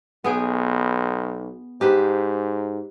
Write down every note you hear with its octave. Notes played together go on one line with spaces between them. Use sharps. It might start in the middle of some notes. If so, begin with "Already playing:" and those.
B1 B3 G#4 G5
G#2 G4 B4 C5